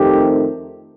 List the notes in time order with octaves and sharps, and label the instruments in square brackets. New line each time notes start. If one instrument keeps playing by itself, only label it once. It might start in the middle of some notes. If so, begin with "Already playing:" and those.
Already playing: [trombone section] F2 D#3 A3 C4 G4